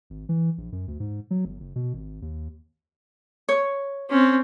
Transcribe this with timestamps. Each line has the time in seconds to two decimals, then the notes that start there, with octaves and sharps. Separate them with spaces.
0.10 G#1
0.29 E3
0.58 A#1
0.72 F#2
0.88 D2
1.00 G#2
1.31 F#3
1.45 G1
1.60 F#1
1.76 B2
1.94 G#1
2.22 D#2
3.49 C#5
4.10 C4 C#4